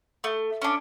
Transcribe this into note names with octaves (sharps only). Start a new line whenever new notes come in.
A3
C#4 D4